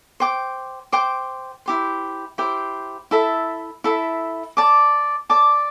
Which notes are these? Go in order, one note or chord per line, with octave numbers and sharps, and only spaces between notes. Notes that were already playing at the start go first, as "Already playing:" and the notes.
C5 G5 D6
C5 G5 D6
E4 G4 C5
E4 G4 C5
E4 A4 E5
E4 A4 E5
D5 A5 D6
D5 A5 D6